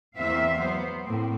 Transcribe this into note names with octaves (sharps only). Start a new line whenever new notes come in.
E2 A#3 C4 E5 F5
F#3 B3 C5
A2 A3 A#3 C4